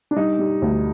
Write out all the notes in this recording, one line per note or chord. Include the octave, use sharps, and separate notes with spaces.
D4
G3 D#4
G3
D2